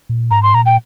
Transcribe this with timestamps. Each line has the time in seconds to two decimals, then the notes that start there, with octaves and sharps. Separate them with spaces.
0.09 A#2
0.31 G#2 A#5
0.43 C6
0.54 A#2 A#5
0.66 G5